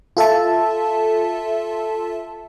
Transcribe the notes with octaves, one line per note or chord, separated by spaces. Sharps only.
F4 A4 E5 A5